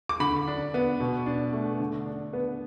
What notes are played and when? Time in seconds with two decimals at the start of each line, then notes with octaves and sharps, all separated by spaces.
0.09 D6
0.20 D3 B5
0.48 D4
0.74 B3
1.00 B2
1.26 D4
1.53 A3
1.80 D3
2.06 D4
2.33 B3